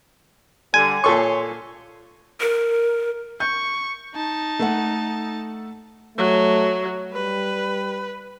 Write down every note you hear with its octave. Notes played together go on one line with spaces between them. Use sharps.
D3 G3 G#5
A#2 A4 C#5 C6 C#6
A#4
C#6 G6
D#4 A5
A3 A4 F#5
F#3 A3
G3 B4